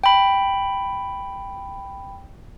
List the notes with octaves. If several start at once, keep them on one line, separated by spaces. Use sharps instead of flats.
G5 B5